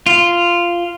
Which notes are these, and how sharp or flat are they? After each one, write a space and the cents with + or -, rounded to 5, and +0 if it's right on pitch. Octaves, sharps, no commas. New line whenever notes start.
F4 -10